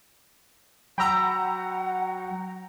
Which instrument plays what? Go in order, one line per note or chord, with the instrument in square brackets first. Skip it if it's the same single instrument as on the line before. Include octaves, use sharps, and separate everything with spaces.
[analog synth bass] F#3 [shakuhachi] F#5 [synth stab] G5 A#5 [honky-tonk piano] B5 E6